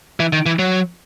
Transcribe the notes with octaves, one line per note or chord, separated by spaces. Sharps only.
E3
D#3
E3
F#3